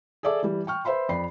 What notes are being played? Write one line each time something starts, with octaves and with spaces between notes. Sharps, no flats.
G#4 A4 D5 E5 D6
E3 G3
G5 C#6 F6
B4 C5 E5 B5 C6
F2 D5 B5 C7